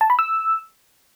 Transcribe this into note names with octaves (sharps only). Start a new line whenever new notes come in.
A5
B5
E6